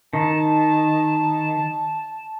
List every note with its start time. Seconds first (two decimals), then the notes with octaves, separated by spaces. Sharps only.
0.13 D#3 A5